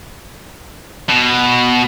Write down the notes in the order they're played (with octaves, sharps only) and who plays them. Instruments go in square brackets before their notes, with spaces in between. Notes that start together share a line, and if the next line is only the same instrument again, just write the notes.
[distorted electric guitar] B2